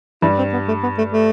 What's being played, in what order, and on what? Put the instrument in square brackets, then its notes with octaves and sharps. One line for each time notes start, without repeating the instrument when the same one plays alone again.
[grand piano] G2 G3 [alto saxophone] E4
[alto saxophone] C4
B3
A3
B3
A3
A3